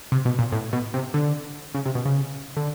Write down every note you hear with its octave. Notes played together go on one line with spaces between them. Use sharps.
C3
B2
A#2
A2
B2
C3
D3
C#3
C3
B2
C#3
D3